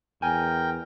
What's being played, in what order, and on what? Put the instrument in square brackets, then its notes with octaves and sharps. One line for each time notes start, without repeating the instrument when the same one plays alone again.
[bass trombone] E2 [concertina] A#4 G5 [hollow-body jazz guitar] G#5